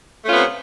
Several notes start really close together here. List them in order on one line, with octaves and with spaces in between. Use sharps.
A3 C#4 F4 B3 C3